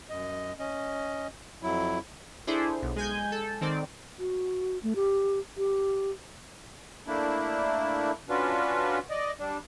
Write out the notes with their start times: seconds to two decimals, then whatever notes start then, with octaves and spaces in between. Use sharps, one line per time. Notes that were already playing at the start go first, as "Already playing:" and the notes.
0.10 F#2 D#5
0.59 C#4 D#5
1.63 F2 F#3 E4
2.47 D4 E4 G#4 A4 C5
2.82 B1
2.96 G#3 G#5 G6
3.32 A4
3.61 D#3 C4 D5
4.19 F#4
4.83 A3
4.96 G4
5.57 G4
7.07 A3 A#3 D4 E4
8.29 C#4 D4 F4 F#4 B4
9.10 D5 D#5
9.40 G3 D4